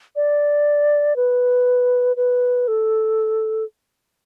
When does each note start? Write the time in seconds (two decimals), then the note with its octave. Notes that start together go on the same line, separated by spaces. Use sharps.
0.16 D5
1.16 B4
2.16 B4
2.68 A4